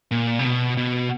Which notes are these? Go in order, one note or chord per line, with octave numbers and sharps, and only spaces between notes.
A#2
C3
B2
B2